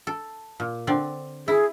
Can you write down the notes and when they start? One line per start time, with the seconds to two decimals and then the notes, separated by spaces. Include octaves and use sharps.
0.07 A4
0.60 A#2
0.87 D3 C4 D5
1.48 E4 G#4